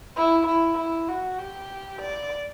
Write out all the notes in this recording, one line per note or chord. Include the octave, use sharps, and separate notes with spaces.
E4
E4
E4
F#4
G4
D5